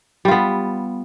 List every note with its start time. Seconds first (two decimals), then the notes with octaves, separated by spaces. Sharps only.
0.25 G3
0.28 F4
0.31 B3